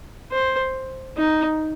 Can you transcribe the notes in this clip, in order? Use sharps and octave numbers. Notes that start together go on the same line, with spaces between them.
C5
D#4